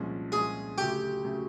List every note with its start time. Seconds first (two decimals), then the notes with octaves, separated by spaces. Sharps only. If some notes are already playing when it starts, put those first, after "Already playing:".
Already playing: C2 A#2 F3 G#3 C#4
0.32 C2 A#2 F3 G#3 C#4 G#4
0.78 D2 C#3 F#3 A3 G4
1.24 C#3 F#3 A3